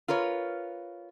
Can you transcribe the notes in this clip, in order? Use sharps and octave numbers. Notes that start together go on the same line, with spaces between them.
F4 A#4 B4 C#5